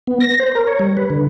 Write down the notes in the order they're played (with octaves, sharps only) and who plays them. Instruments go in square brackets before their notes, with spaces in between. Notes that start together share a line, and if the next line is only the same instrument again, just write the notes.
[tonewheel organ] B3
A#6
C5
A#4
C#5
G3
B4
D3